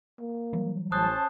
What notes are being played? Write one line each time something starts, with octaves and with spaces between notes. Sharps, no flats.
A#3
E3 F#3 G3
A1 C#4 C5 A5 D#6 F#6